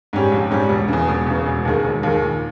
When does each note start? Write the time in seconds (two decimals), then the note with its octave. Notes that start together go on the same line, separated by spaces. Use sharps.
0.13 G#2 G3 C#4 G4
0.32 A#1
0.51 G#2 G3 C#4 G4
0.69 E1
0.88 E2 C#3
1.08 E1
1.26 E2 C#3
1.46 E1
1.65 D#2 D#3 G#3
1.84 E1
2.03 D#2 D#3 G#3
2.22 A#2